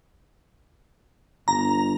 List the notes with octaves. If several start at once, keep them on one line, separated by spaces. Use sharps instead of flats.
G1 A#5